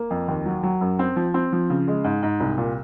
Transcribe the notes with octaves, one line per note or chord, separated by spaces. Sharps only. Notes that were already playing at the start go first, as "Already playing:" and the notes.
Already playing: A#3
F2
D#2
F#3
F#3
F#2
C4
F3
C4
F3
C#3
G#3
G#2
G#2
C2
A#2